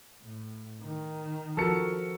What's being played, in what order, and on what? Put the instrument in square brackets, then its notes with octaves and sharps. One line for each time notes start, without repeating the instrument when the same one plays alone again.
[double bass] A2
D#3
[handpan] F3 F#4 [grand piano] A4 A#4 C#7